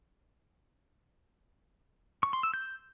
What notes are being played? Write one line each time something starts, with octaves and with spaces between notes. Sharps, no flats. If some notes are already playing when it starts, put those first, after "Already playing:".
C#6
C6
E6
G6